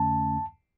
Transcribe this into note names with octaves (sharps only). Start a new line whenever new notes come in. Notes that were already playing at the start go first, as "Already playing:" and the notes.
Already playing: F2 D3 A3 C#4 A5